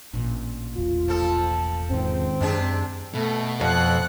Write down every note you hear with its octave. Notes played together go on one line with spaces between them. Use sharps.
A1 A#2 D4
E1 F4
F3 A4
C#2 G#2 D#3 C4
F#2 C3 D4 G#4
B2 A3
F2 F#5 F#6